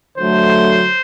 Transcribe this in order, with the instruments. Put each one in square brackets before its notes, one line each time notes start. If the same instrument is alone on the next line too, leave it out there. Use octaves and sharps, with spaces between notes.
[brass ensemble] D3 F#3 A3 C5